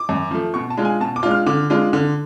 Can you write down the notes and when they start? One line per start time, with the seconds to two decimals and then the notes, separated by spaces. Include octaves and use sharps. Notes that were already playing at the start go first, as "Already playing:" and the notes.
Already playing: D6
0.09 F#2
0.31 F3 A3
0.54 B2 C#6
0.70 A5
0.77 G#3 D4 F4
0.85 G#5
1.00 B2 A5
1.16 D6
1.23 G#3 D4 F4
1.31 F6
1.46 D3 D6
1.70 G#3 D4 F4
1.93 D3